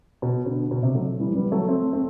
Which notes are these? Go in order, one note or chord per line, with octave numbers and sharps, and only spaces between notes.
B2
B2 D3
B2
C3
F#3 A3
E3 G3
G3 B3
F#3 A3
A3 C4
A3 C4